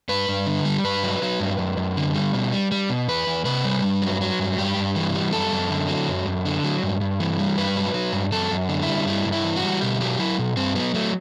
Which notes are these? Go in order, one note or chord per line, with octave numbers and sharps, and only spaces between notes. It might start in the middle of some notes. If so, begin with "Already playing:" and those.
G2 B4
G2
D3
G3
G2 B4
F#3
F#3
G2
F#2
F#2
D3
G3
B2
G3
G3
B2
E2 B4
E2
C3 B4
G3
G2
F#3
F#3
G2
G2 G4
G2
E3
G3
F#2 A4
F#2
D3
F#3
F#2
F#2
D3
F#3
G2
G2
E3
G3
G2 B4
F#3
F#3
G2
F#2 A4
F#2
D3
E4
G3
G2 E4
G2
E4
E3
F#4
G3
B2 G4
F#3 G4
F#3 E4
B2
G2 C4
F#3 B3
F#3 A3